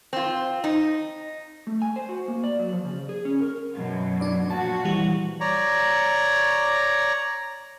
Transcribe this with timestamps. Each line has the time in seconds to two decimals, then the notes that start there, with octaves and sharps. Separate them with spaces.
0.13 C4 F4
0.64 D#4
1.67 A3
1.82 G#5
1.96 C5
2.09 F#4
2.28 A#3
2.44 D5
2.59 F#3
2.73 F3
2.85 C#3
3.09 G#4
3.25 C#4
3.40 A#4
3.75 F#2 B2 F#3
4.21 D4 D5
4.50 A#2 F3 F#4 A5
4.85 E3 G3
5.40 C#5 D5 A#5